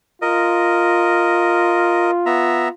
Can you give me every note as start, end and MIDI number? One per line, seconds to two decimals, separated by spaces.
0.22 2.72 65
0.22 2.11 70
0.22 2.11 75
2.26 2.68 59
2.26 2.68 76
2.26 2.68 82